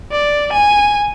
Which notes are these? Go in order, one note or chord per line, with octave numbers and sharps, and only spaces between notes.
D5
G#5